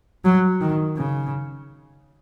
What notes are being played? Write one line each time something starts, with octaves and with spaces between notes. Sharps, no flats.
F#3
D#3
C#3